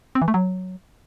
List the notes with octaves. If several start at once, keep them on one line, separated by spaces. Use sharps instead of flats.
C4
E3
A3
F#3